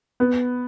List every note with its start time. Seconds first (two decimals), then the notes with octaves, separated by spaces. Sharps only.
0.20 B3